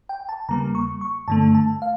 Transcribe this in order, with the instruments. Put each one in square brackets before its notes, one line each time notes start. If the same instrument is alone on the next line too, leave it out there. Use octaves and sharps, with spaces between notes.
[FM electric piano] G5
A5
E2 C#3 G3 A#3 A#5
C#6
C#6
G2 D3 A3 A5
A5
F5